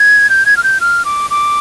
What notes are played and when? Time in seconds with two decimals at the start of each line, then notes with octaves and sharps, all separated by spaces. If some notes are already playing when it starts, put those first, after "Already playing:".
Already playing: G#6
0.30 G6
0.46 G#6
0.57 F6
0.64 G6
0.81 F6
1.05 D6
1.31 D6